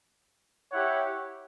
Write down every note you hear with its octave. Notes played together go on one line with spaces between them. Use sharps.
E4 G4 C#5 F#5